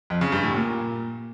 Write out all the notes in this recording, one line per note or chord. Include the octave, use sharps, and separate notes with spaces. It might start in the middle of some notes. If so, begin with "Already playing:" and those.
F2
C#3
G2
A2
A#2